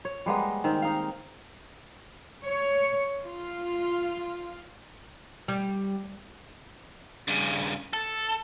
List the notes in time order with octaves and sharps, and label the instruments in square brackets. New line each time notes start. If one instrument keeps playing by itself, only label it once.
[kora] C#5
G3 G#3 A#3 B3
D#3 C4
D#4 F5
[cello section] C#5
F4
[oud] G3
[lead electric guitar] G2 C#3
A4